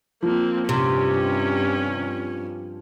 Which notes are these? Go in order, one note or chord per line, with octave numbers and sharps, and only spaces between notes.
F3 A#3 C4
G2 C3 C#4